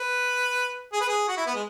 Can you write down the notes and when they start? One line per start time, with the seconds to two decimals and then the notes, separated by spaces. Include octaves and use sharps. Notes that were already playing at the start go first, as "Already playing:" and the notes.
Already playing: B4
0.92 G#4
1.01 B4
1.08 G#4
1.28 F#4
1.37 E4
1.46 B3
1.54 G#3